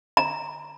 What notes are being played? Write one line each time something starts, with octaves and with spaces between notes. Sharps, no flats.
A#5